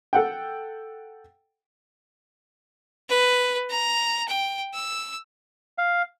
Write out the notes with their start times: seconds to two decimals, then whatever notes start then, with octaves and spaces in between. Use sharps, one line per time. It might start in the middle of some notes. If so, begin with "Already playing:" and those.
0.13 A4 F#5 G5
3.10 B4
3.70 A#5
4.28 G5
4.74 E6
5.78 F5